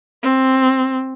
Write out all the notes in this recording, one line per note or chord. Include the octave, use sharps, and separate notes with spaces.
C4